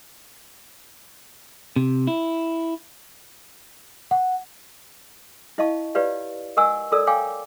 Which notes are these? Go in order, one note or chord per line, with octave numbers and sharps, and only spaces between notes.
C3
E4
F#5
E4 D#5 F5 A5 C#6
F4 G4 B4 C#5 D5 F5
A#4 D#5 F#5 G#5 C#6 E6
F4 A4 A#4 D5 E6
C#5 F5 G5 G#5 D6